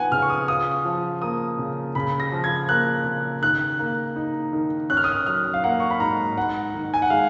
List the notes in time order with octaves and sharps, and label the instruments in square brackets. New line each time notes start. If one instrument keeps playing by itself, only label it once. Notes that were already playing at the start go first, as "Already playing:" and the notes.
Already playing: [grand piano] F3 B3 D#4 F#5 G#5
C#3 F6
C#6
D#6
F4 D#6
F3
A#3 D#6
C#3
C#3 B5
A#6
F3
G#6
A#3 F#6
C#3
D#3 F#6
A#3
D#4
D#3
C#4 F#6
F6
D#6
F6
F#3 F6
F5
A#3 F#5
C#6
B5
G#2 A#5
G#2 F#5
D#3
G#5
F#5
G#3 F5